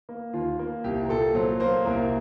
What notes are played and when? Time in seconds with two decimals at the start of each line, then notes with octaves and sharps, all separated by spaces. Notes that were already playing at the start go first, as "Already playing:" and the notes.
0.09 A#3
0.33 D#2 F4
0.59 A#3
0.84 C2 G4
1.05 A#4
1.09 A#2 A4
1.35 F#3 C5
1.60 A#3 C5
1.85 C2 A#4